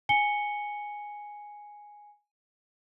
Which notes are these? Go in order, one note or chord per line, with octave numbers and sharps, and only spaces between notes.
G#5 C#7 G7